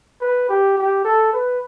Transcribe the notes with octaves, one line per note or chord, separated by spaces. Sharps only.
B4
G4
G4
A4
B4